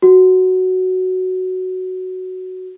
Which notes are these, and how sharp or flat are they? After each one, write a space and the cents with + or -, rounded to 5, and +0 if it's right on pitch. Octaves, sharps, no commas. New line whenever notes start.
F#4 +5